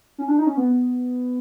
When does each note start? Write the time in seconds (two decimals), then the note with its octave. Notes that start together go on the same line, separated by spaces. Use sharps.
0.18 C#4
0.28 D4
0.38 D#4
0.47 C#4
0.57 B3